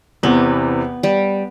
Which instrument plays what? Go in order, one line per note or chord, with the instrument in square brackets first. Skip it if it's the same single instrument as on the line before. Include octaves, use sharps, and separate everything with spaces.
[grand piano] E2 C3 E3 [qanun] B3
[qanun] G3